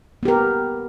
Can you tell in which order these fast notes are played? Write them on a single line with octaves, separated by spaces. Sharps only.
B3 G4 A#4